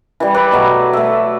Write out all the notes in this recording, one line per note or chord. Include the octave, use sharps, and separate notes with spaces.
E3 G3
B4 D5 E5
B2 F#3 A3
A3 E5